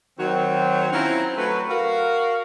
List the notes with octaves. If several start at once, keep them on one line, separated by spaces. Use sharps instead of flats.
D#3 F#3 C4
C4 C#4 E4 F4 F#5 A#5
F#3 A3 F#4 B4
F#4 A#4 F5